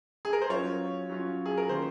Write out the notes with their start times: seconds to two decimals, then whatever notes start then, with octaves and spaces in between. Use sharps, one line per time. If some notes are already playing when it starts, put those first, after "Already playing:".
0.25 G#4
0.33 A#4
0.42 C5
0.50 F#3 C#4 F4 C#5
1.10 F#3 C#4 F4
1.46 G#4
1.57 A#4
1.69 D#3 A#3 C#4 F4 C5